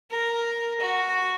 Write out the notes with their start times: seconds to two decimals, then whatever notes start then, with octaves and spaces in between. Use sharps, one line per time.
0.11 A#4
0.80 F#4